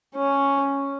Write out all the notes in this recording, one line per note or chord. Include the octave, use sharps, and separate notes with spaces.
C#4